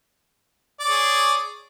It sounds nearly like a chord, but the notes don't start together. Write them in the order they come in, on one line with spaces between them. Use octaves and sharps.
D5 C#5 G#4